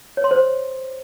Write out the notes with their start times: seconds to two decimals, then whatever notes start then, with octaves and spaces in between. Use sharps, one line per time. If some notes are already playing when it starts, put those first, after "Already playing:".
0.17 C#5
0.24 C6
0.31 C5